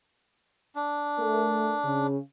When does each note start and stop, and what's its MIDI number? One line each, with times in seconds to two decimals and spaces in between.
0.76 2.07 62
1.18 1.75 57
1.18 1.75 70
1.84 2.17 49